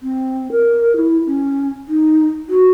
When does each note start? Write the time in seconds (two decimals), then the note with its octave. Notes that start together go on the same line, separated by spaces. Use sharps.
0.02 C4
0.52 A#4
0.96 E4
1.26 C#4
1.88 D#4
2.49 F#4